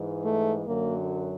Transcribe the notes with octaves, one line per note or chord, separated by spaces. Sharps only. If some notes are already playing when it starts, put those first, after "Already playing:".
Already playing: G#2 E3 G#3
A3
F#2 D3 F#3 A#3